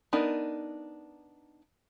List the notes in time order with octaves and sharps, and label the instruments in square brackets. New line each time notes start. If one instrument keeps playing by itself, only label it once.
[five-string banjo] B3 D4 D#4 A#4